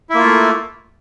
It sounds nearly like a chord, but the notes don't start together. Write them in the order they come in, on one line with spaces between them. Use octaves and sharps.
E4 A#3 F4 A3